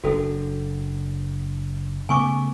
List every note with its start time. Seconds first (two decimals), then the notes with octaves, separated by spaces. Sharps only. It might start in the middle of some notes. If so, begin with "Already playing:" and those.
0.04 F#1 D4 F#4 A4
2.09 C#3 A3 B3 G#5 C#6 D6